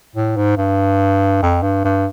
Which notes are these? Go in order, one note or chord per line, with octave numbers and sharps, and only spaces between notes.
A2
G#2
G2
F2
G2
G2